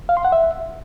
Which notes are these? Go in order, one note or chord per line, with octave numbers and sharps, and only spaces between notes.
F5
C6
F#5
E5